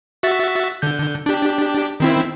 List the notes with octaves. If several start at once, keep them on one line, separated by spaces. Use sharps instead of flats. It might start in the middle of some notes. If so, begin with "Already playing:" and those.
F#4 E5 A6
D3 G6
D4 G4
D#3 C4 E4